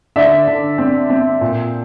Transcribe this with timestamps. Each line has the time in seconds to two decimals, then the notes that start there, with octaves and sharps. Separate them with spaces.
0.16 D3 D5 E5
0.47 D3
0.78 C4
1.10 C4
1.41 A#2